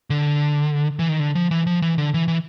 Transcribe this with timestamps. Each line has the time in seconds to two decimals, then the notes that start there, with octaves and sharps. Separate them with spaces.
0.10 D3
0.99 E3
1.09 D#3
1.19 D3
1.35 F3
1.51 E3
1.67 F3
1.82 E3
1.98 D3
2.14 E3
2.28 E3